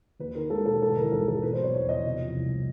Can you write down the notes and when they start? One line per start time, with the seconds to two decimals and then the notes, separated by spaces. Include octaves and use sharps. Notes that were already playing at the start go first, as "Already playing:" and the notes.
0.19 D#2 B4
0.35 D#3 A#4
0.50 G#3 A4
0.66 E1 A4
0.81 G#2 A4
0.96 E3 A#4
1.12 G#1 A4
1.27 G#1 A4
1.43 B2 B4
1.53 C5
1.58 F#3
1.64 C#5
1.74 E2 C#5
1.89 E2 D#5
2.05 C3
2.21 F3
2.35 C2